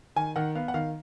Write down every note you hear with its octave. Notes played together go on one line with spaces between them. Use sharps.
D#3 G#5
D#3 F#5
B3 F5
F#5
D#3 F5